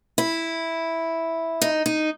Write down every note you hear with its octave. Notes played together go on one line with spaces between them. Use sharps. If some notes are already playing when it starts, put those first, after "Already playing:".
E4
D#4
D#4